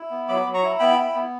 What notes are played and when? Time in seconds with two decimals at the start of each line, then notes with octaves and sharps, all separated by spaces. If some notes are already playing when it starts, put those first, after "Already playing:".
Already playing: E4
0.10 B3
0.28 F#3 B5 D6
0.46 F#3
0.54 A#5 C#6
0.63 E4
0.79 B3 G5 B5
0.97 E4
1.14 B3